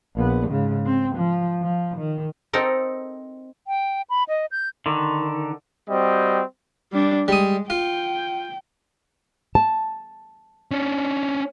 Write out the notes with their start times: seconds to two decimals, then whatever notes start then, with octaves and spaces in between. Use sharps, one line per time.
0.16 A#1 B3
0.48 G#2 C#3
0.86 C4
1.16 F3
1.62 F3
1.97 D#3
2.53 C4 D#4 A4 A#4
3.67 G5
4.10 B5
4.29 D#5
4.51 G6
4.86 D3 D#3
5.89 G3 C4 F#4 D#5
6.93 G3 D4
7.28 G3 G#3 D#6
7.70 F4 G5
9.55 A5
10.71 C#4 D4